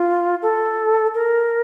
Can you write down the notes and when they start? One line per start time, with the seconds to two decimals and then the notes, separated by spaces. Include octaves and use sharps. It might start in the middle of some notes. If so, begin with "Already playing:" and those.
Already playing: F4
0.42 A4
1.14 A#4